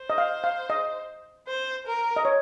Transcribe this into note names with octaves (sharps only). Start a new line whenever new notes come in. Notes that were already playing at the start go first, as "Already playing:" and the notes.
Already playing: C5
D#5
F5
F5
D#5
C5
A#4
D#5
C#5